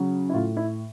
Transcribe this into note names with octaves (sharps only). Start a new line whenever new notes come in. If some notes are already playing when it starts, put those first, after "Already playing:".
Already playing: C#3 F#3
E4
A2 F4
E4